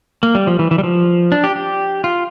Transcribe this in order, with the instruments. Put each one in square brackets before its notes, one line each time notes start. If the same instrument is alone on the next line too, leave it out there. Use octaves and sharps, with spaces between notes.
[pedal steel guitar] A#3
G3
F3
E3
E3
G3
F3
D4
G4
G4
F4